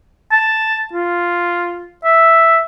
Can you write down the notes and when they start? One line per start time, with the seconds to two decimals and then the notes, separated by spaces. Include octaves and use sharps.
0.32 A5
0.93 F4
2.04 E5